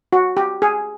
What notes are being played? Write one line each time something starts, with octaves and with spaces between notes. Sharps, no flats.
F#4
G4
G#4